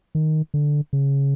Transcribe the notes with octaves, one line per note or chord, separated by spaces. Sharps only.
D#3
D3
C#3